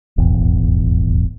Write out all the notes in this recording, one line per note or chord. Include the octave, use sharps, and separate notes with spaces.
D#1 G#1 E2